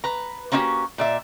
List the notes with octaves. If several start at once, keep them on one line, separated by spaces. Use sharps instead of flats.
B4 A#5
A#3 C4 C#4 D#4 F#4 G4
A#2 D5 E5